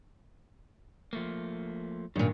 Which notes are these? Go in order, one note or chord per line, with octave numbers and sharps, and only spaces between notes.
F3 A3 A#3
G2 A#2 D3 D#3